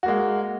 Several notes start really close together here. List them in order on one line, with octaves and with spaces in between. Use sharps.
F#4 A#3 G#3